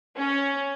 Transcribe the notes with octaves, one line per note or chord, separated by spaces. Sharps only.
C#4